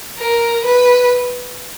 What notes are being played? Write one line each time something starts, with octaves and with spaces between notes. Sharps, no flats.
A#4
B4